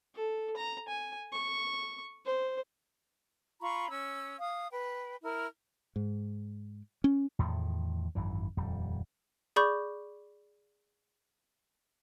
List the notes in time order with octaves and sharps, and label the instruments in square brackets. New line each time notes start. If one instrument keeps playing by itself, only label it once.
[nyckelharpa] A4
A#5
G#5
C#6
C5
[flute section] F4 A#5 B5 C#6
C#4 E6
F5 D#6
B4 G5
E4 A#4 F6
[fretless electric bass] G#2
C#4
[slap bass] E2 A2 D#3 F3
G#1 F#2 E3
D#1 F2 G3
[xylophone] G#4 D5 B5 C#6 D6 G6